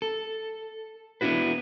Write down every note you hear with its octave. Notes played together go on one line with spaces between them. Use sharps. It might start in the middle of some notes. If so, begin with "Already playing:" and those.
A4
B3 D4 E4 F#4 B4